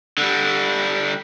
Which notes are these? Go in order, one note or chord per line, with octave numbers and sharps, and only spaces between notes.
D3 G3